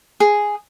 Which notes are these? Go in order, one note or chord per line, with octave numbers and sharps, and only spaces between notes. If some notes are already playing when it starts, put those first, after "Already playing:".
G#4